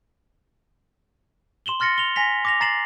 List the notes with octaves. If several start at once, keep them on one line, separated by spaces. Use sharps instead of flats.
C6 E7 F#7 G7
C6 F6 A6 A#6 C#7
F7 G7
G#5 A#6 B6 F7
D6 A#6 F7
A#5 A6 C7 E7 F#7